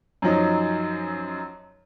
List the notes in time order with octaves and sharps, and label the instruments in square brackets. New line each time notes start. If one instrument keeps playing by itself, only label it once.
[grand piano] F#2 F3 F#3 D#4